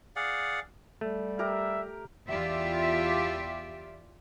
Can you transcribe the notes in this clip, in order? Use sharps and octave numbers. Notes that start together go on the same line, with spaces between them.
G#4 D5 F5 F#5
G3 A3
G4 A#4 E5 A#5
E2 F4 G4 D5 E5